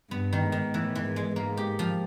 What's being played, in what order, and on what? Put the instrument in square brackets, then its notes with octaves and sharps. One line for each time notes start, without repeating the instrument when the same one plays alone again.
[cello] G2 [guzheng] B3
[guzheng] D#3
[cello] G#2
[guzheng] D#3
[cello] A2 [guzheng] E3
[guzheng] E3
[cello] G#2
[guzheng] G#3
[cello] G#2 [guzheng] A#3
[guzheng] G4
F3